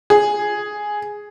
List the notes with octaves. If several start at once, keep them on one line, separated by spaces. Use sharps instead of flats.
G#4